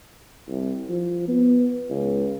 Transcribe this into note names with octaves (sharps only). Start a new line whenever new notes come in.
C2
F3
B3
C#2